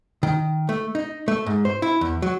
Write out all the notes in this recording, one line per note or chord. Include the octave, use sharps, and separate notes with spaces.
D#3
A3
D#4
A3
G#2
C5
E4
E2
F#3